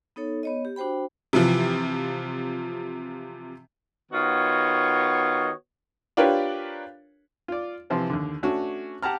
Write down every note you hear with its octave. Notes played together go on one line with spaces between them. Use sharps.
B3 D#4 A4 C#5
B3 C#5 D#5
G4
D4 F#4 C5 G5 B5
C3 E3 F3
D#3 B3 F4 F#4 C#5 D#5
D4 F4 G4 A#4 B4 C#5
F4 D5
C3 E3 F3 C4
D#2 D3
A3 C#4 D4 F#4
G4 F#5 A5 A#5 F6